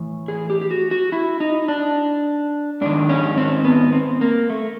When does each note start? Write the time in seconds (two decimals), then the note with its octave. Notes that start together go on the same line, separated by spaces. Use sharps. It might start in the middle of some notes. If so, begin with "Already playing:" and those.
Already playing: A2 E3
0.28 G#4
0.50 G4
0.61 G4
0.71 F#4
0.91 F#4
1.12 E4
1.40 D#4
1.68 D4
2.81 G#2 D#3 D4
3.09 C#4
3.38 C4
3.65 B3
3.93 C4
4.21 A#3
4.50 A3